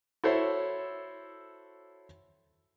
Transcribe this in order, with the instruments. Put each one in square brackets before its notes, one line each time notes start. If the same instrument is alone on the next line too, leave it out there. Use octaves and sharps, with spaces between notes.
[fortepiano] E4 F#4 A4 C5 C#5 E5